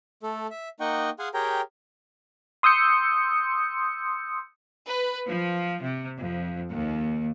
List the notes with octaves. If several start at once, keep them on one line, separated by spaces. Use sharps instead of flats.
A3 A4
E5
A#3 D#4 D#5 F#5 G5 C#6
G#4 F5 F#5 G#5 C6
G4 G#4 A#4 C#5 G5 A#5
C6 D#6 E6 G6 C#7
B4
F3
C3
F2
D#2